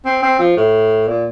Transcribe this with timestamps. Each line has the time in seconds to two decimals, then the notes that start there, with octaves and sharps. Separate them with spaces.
0.05 C4
0.23 C4
0.40 F3
0.57 A2
1.08 A#2